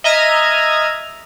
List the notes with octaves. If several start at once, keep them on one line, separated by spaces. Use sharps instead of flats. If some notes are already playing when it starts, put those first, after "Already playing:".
D#5 E5 A#5 F6 G#6 D#7